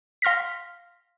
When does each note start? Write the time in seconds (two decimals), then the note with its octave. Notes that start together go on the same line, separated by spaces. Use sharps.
0.22 F5 C6 F6 A#6 B6